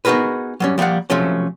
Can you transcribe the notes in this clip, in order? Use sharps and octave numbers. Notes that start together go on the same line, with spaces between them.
B3 D#4 F#4 G#4 A#4 B4
F#3 G3 C#4
F3 G3 A#3 F5 F#5
C3 F3 F#3 A3 C#4